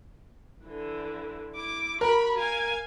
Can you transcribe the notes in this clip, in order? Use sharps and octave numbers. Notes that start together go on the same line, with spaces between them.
D3 E3
E4 D6
F#4 A#4 B5
F5 G#5